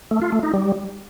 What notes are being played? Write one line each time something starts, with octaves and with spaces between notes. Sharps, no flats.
A3
F4
A3
D#4
G3